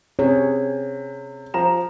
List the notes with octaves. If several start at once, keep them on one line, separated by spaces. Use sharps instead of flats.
C3 G#4 C#5
F3 A#5 E7